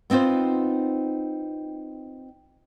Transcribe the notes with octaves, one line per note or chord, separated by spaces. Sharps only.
B3 C4 D#4 F4 C5